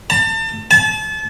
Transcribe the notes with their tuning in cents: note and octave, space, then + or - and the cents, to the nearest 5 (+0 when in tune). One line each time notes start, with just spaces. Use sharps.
A5 +35
A5 -30